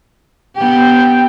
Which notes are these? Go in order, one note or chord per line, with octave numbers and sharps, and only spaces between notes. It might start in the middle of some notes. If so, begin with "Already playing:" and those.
B3 G4 G5